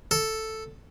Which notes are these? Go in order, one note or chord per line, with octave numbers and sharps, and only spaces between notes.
A4